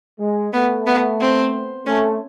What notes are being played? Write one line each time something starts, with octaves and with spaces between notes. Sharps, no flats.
G#3
A3 B3
B3
C4
A3 C#4